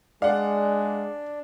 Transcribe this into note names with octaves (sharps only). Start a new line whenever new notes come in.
G#3 D4 D5 F5 F#5